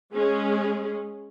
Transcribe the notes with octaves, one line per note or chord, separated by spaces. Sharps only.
G#3 C#4 G#4